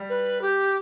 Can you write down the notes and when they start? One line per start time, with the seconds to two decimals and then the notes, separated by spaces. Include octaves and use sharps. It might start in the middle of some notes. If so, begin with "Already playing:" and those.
Already playing: G3
0.09 B4
0.42 G4